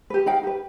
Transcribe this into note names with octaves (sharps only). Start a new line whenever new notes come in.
G4 B4
D#4 F5 G5
G4 B4